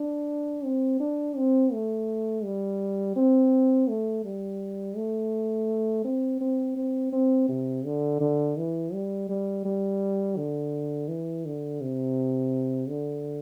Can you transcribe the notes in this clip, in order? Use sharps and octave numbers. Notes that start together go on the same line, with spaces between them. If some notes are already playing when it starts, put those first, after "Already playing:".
Already playing: D4
C4
D4
C4
A3
G3
C4
A3
G3
A3
C4
C4
C4
C4
C3
D3
D3
E3
G3
G3
G3
D3
E3
D3
C3
D3